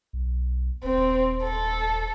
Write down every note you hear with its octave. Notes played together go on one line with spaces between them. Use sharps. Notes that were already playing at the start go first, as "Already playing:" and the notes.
B1
D#1 C4
A4